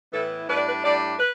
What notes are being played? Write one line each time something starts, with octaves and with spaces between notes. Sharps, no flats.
A2 E3 B3 E4 A4
A2 G3 D4 B4
D5
B4
A2 G3 D4 D5
B4